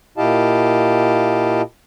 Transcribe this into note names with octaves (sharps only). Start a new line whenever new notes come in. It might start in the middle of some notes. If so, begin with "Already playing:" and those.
A#2 E4 G4 D#5 F5 A5